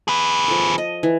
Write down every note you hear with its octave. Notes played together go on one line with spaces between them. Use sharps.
G#4 B4
F3 A4
D#5
E3